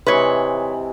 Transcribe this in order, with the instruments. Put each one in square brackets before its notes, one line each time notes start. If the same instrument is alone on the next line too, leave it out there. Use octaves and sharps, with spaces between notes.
[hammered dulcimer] C3 E3 G#3 [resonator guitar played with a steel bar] B4 C#5